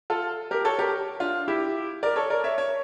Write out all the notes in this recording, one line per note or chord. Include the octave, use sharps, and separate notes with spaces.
F4 A4
G4 A#4
A4 C#5
G4 A#4
D4 F4
E4 G4
A#4 D5
A4 C#5
A#4 D5
C#5 E5
C#5 E5